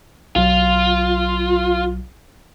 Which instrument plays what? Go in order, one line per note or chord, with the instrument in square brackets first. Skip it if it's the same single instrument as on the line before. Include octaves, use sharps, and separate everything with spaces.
[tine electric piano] B1 F#3 [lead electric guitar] F4